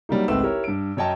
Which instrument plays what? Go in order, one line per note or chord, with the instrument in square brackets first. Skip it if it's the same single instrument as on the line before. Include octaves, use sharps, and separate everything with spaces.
[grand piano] F#3 G3 A#3 D#4
G#1 C#2 A3 C4 B4 E6
E4 G4 A#4 C#5
G2 D7
F#2 C#4 C#5 D#5 G5 A5